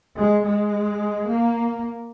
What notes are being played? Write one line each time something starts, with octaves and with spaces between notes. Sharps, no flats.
G#3
G#3
A#3